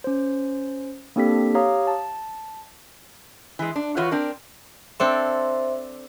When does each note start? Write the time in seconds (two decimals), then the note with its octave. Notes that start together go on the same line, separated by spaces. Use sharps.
0.04 C#4 C5
1.16 A#3 C4 D4 G4 A4 B6
1.54 G4 C#5 F5 A#5 D#6
1.87 A5
3.59 E3 G#3
3.76 D4
3.97 E3 F4 F#4 B4 C#5
4.11 C4 D4 A#4
5.00 C4 D4 A4 C5 E5 C6